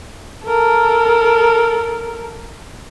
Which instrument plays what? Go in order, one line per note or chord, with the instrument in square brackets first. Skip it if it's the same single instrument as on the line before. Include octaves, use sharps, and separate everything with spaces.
[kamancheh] A4 A#4